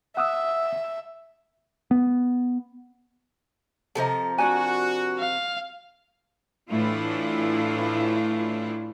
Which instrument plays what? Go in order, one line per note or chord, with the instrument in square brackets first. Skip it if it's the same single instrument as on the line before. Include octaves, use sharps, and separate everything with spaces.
[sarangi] E5 [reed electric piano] F#5 D#6 E6
[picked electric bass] B3
[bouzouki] C3 F3 A#4 [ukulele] A4 C5 D#5
[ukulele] D4 D5 G#5 [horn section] F#4
[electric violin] F5
[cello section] A2 E3 A3 D4 E4 F4